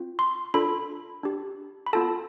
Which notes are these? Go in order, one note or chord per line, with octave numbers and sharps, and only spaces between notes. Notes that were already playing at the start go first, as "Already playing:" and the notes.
Already playing: C4 F4
C6
D4 F4 A4 B5
D4 G4
B5
B3 F4 A4 A5